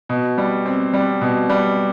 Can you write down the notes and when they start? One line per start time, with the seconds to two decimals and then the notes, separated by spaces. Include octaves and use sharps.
0.09 B2
0.38 G3
0.66 C4
0.93 G3
1.21 B2
1.50 G3